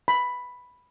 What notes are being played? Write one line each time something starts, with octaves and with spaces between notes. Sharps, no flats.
B5